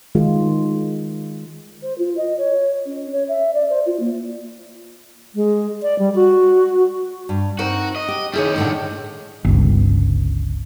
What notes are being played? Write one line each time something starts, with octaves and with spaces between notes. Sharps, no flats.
D#3 G#3 F4
C5
F4
D#5
C#5
C#4
C#5
E5
D5
C5
F4
A#3
G#3
D5
G3
F#4
G2
C4 D#4 F#4 A#4
D#5
G4
D#3 G3 E4 G#4 C#5
A2 D3 C#5
G1 C#2